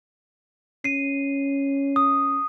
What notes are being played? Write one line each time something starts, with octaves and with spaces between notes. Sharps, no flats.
C#4 C7 D#7
D#6